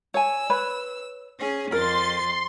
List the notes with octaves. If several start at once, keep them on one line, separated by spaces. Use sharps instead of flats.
C#5 G#5 E6
B4 C#5 B5
C#4 G#4
F2 A#4 C6 A6